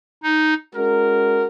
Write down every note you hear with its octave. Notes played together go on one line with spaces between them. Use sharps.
D#4
G#3 C#4 F#4 A#4